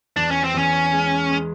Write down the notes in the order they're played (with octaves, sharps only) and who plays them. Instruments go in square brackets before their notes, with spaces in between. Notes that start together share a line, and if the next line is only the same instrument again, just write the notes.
[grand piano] E2 [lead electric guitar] D4
[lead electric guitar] C#4
C4
[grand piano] E2 [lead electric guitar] C#4
[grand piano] G#3
G#3